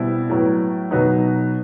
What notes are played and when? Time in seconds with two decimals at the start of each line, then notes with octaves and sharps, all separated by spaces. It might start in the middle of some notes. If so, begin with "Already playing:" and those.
Already playing: B2 G3 C4 E4
0.30 A2 F#3 B3
0.91 B2 F#3 B3 D#4